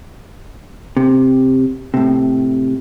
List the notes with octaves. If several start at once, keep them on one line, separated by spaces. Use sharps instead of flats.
C3
A2 C3